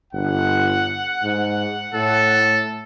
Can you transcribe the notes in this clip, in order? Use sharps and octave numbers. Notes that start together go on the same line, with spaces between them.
G1 F#5
G#2
A2 A4